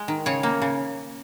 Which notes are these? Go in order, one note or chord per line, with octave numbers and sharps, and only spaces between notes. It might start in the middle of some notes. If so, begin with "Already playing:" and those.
Already playing: G#3
D#3
C#3 C#5
A#3
C#3